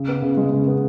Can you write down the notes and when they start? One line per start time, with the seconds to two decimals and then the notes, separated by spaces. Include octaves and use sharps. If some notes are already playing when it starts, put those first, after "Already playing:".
Already playing: C#3
0.08 B3
0.22 C#3
0.37 G#3
0.52 C#3
0.67 B3